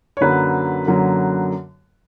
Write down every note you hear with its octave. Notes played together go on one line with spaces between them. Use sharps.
C#5
F#2 D3 F#3 A#3 B4
F#2 D3 F#3 A#3